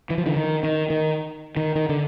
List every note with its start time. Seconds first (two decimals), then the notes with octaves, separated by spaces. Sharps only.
0.10 E3
0.18 F3
0.26 D3 E3
0.36 D#3
0.63 D#3
0.90 D#3
1.57 D#3
1.75 D#3
1.89 D3